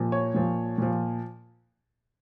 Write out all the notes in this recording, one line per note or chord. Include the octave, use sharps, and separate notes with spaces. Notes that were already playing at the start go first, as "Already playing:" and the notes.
Already playing: A#2 F3
C#5
A#2 F3
A#2 F3